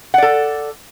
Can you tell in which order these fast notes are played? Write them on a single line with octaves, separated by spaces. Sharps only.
F#5 D5 A4